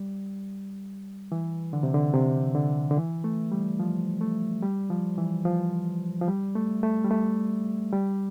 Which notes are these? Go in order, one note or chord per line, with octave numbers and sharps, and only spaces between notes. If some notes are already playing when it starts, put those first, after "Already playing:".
Already playing: G3
E3
D3
C3
D3
C3
D3
D3
E3
A3
G3
F3
A3
G3
F3
E3
F3
F3
G3
A3
A3
G3
A3
G3